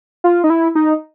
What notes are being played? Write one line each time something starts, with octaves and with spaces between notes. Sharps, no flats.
F4
D#4
E4
D#4